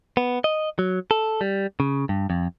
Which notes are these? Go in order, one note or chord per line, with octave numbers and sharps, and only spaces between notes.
B3
D#5
F#3
A4
G3
C#3
G2
F2